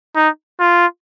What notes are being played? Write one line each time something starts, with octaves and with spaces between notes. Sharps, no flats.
D#4
F4